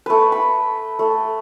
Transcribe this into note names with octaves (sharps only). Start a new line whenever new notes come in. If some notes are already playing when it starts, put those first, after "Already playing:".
A3 B4
B5
A3